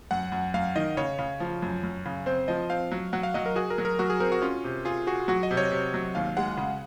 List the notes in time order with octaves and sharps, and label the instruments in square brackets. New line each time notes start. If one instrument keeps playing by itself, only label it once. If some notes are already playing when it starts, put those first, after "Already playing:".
[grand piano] F#2 [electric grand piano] F#5
[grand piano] F#2
[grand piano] F#2 [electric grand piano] F5
[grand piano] D#3 [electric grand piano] D#5
[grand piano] C#3 [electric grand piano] C#5
[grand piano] C#3
F3
F#2
F#2
C#3
[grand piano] C4 [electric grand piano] C5
[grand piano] F3 [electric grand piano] D#5
[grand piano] C4 [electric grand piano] F5
[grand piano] F#3
[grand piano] F#3 [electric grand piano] F#5
[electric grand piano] F5
[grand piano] F#3 [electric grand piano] D#5
[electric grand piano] A#4
[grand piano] F#4 [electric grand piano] G#4
[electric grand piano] A#4
[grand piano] F#3
[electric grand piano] A#4
[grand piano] F#3 [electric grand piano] F#4
[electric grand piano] G#4
[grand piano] C4 [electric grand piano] A#4
[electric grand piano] F#4
[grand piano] C#4 [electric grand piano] F4
[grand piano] C3
[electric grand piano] F4 [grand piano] G#4
[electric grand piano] F#4 [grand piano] G#4
[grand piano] F#3 [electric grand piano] F#4
[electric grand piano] D#5
[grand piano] C3
[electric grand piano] C#5
[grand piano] C3
F#3
[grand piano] D#2 [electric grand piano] F5
[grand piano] G#3 [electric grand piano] F#5
[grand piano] C#3